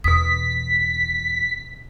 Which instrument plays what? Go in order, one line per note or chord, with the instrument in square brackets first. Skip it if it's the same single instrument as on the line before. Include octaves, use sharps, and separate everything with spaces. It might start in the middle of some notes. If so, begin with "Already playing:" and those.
[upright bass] E2 [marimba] B2 D#6 [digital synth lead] B6